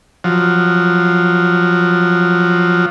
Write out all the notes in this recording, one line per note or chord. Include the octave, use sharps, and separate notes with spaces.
F3 F#3